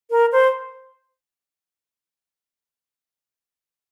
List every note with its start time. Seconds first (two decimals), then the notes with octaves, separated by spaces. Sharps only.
0.11 A#4
0.32 C5